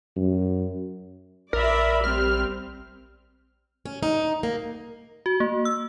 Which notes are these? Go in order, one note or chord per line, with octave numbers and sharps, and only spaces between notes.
F#2
A#1 A#4 D5 E5 B5
G3 C4 F6
C#4
D#4
A#3
F#4
A#3
E6